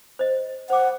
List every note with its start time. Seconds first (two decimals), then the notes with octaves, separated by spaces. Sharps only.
0.19 C5 D#5
0.70 C5 F#5 D6